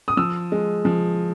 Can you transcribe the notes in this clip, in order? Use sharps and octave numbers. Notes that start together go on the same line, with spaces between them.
D#6
F3 E6
G#3
F3